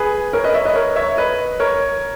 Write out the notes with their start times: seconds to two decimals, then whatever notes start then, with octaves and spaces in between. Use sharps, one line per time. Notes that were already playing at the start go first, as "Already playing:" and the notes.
Already playing: G#4 B4
0.33 A#4 C#5
0.44 B4 D#5
0.54 C#5 E5
0.65 B4 D#5
0.75 A#4 C#5
0.96 C#5 E5
1.17 B4 D#5
1.60 A#4 C#5